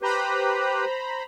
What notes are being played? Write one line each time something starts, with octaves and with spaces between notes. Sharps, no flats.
G4 B4 C5 A#5 B5